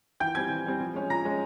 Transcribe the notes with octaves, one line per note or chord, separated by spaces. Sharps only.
E3 G5 G6
G3 C4 G#5 G#6
E3
G3 C4
F3
G#3 C#4
F3 A#5 A#6
G#3 C#4